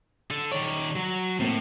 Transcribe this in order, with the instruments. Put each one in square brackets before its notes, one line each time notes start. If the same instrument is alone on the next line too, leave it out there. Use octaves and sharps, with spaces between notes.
[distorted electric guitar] D3 A4
[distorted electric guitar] D#3 D5 [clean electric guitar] C#5
[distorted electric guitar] F#3
[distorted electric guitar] A2 [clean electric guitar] A#3 C4